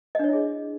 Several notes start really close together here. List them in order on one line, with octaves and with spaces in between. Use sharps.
D#5 D4 C#5 E4 G#4